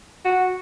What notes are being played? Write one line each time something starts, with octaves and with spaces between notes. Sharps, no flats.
F#4